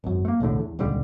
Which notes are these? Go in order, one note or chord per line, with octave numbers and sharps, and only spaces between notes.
G#1 F#2
A3 A#3
B1 E2 A2 D3
E2
D#1 C#2 D3 G3